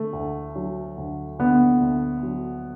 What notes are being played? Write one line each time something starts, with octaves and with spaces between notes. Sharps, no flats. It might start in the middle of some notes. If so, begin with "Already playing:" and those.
Already playing: D3 A3
D2
F#3
D2
D3 B3
D2
F#3